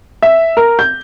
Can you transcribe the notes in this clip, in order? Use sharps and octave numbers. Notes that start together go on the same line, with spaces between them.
E5
A#4
G6